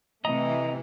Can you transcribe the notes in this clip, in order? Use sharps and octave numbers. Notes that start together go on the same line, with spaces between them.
C3 E3 A3 D#5 A#5 D#6